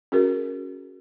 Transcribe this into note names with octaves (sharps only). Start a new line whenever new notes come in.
C#4 F#4 G#4 A#4